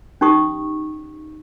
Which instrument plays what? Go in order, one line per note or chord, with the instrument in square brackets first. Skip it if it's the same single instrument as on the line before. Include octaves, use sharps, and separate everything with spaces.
[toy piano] C#4 D#4 G4 C#6 D#6